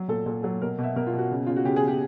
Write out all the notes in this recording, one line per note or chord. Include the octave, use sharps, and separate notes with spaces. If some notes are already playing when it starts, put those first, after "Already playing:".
Already playing: F#3
A#2 A4
A#2 A4
F#3 A4
B2 A#4
B2 E5
B2 A#4
F4
B2
F#4
C#3
C#3 F4
F#4
C#3 G4
G#4
C#3
G4